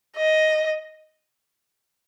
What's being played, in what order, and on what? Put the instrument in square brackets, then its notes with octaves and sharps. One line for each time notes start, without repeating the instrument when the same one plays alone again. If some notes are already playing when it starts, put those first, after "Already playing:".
[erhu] D#5